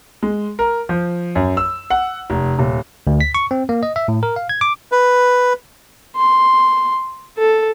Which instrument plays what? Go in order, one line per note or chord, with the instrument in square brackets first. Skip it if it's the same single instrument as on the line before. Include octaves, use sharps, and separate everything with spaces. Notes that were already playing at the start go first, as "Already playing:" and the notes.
[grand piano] G#3
A#4
F3
F#2
E6
F#5
F1
D#1
[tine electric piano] D2
B6
C#6
C4
A#3
D#5
E5
A2
A#4
F5
G#6
D6
[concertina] B4
[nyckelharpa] C6
A4